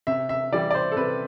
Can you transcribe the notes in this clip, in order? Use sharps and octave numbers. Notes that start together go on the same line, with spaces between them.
C3 E5
E5
E3 G3 D5
D5
C5
A4
C3 B4